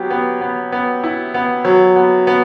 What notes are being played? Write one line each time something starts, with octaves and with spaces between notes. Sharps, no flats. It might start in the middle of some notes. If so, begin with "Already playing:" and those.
Already playing: F#3 B3 G4
B3
B3
B3
E4
B3
F#3
B3
B3